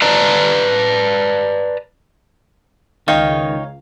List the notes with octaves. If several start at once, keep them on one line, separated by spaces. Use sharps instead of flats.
B4 D5 A5 A#5
C#2 D#3 D#4 C#5 F5 G5